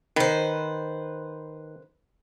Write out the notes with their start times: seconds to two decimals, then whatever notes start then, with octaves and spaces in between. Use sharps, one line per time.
0.16 D#3 B4 C5